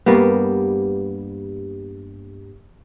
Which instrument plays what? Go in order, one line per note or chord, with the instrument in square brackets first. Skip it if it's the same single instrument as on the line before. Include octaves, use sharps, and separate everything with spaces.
[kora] G2 G3 A#3 B3